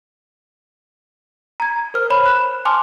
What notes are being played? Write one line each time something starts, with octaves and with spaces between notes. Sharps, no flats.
A#5 G#6
A#4 C5 F6
C#5 B5
F#6 E7
G#5 A5 C6 D6 F6